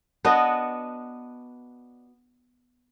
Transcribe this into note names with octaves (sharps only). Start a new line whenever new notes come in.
B3 D4 F#4 D#5